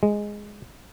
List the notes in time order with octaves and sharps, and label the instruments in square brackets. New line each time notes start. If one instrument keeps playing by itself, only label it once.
[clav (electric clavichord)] G#3